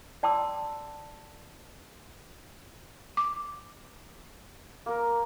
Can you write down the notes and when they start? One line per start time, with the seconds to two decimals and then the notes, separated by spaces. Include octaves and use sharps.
0.23 D5 G5 A5 C6 D6 E6
3.17 D6
4.86 A#3 A#4